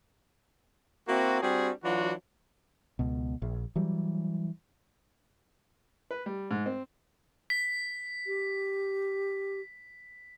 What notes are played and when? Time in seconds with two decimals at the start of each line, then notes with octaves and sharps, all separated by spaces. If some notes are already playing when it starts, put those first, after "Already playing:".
1.08 A#3 C4 E4 F#4
1.42 G3 C4 D4 F#4 G#4
1.84 E3 F#3 D4 F4 F#4
2.99 C#2 B2
3.42 A#1
3.76 E3 F#3 G3
6.11 B4
6.26 G3
6.51 G#2
6.66 C4
7.50 B6
8.27 G4